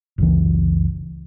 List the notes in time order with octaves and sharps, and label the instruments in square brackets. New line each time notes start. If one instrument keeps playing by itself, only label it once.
[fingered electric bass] F#1 C#2 E3